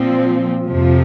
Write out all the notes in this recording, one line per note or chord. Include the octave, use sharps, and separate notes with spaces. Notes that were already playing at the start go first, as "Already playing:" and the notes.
Already playing: A#2 F3 C4
F2 C3 F3